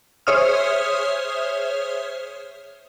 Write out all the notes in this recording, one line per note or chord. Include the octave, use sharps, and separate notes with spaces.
G#4 C5 C#5 E5 D#6 F6